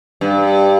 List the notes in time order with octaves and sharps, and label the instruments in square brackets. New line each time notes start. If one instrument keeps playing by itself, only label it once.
[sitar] G2